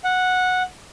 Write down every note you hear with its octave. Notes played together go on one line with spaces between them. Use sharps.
F#5